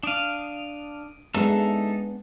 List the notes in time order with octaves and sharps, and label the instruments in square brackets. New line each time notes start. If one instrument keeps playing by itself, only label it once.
[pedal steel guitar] D4 F5 [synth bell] D#6 D7 D#7
[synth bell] G#3 [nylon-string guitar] B3 D4 G#4 [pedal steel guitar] D#4 A4 E5